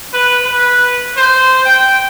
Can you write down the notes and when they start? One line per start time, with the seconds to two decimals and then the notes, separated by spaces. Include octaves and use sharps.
0.13 B4
0.45 B4
1.17 C5
1.65 G5